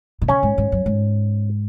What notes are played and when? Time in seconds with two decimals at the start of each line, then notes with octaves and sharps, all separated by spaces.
0.22 A#2
0.28 C#3 C#4
0.43 G#2
0.58 G#2
0.72 F#2
0.86 G#2